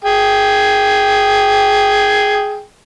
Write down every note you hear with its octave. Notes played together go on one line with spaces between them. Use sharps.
G#4 G5